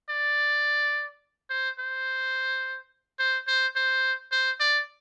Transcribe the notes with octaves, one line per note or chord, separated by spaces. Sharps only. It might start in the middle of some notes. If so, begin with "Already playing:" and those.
D5
C5
C5
C5
C5
C5
C5
D5